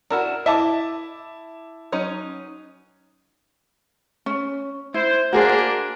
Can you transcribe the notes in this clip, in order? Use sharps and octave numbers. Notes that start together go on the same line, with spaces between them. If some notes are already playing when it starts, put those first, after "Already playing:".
D4 E4 F#4 A#4
E4 D#5 E5 A5 D6
F#3 C#4 D#4
C#4
E4 C5
A#3 D4 F#4 G#4 A#4 C5